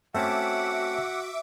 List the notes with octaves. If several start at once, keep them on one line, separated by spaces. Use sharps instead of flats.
A3 C4 C#4 F#4 E5 F#5 D6